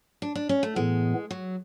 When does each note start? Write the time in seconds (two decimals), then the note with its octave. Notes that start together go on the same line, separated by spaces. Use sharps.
0.22 D4
0.35 D4
0.49 C#4
0.63 A3
0.76 A2 E3 G#3 B3
1.31 F#3